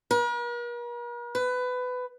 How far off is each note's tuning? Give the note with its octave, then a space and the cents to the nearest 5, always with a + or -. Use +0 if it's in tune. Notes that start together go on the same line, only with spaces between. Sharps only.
A#4 +45
B4 +20